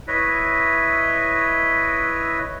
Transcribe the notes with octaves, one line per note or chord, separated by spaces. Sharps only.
E4 B4 C#5 D#5 E5